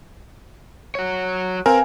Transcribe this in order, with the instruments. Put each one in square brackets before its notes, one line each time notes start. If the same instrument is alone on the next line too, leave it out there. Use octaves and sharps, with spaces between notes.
[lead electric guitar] F#4 C#5
[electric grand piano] C4 A#4 [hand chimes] B4 F5 G#5